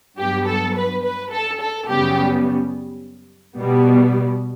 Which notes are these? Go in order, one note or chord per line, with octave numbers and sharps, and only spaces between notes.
G2 F#3 B3 G4
A4
B4
B4
A4
A4
F#2 C#3 G3 B3 G4
B2 G3 B3